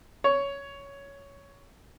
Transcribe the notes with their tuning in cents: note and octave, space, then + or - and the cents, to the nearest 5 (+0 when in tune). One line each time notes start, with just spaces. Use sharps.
C#5 +10